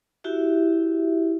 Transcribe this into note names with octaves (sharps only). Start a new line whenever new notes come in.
E4 F#4 G4 E5